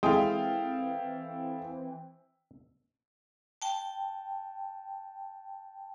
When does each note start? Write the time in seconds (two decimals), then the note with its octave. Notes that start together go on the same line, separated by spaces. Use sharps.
0.03 E3 G#3 C4 E4 A4 F5 G5 D#6
3.62 G5 A5